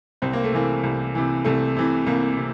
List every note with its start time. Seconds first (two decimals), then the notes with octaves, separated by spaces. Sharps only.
0.22 C2 C4
0.33 A#3
0.44 A3
0.52 C3 E3 A#3
0.83 C2
1.15 C3 E3
1.45 C2 A3
1.77 C3 E3
2.06 C2 A#3
2.37 C3